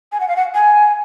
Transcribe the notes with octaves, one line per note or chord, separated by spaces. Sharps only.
G#5
F#5
F5
F#5
G#5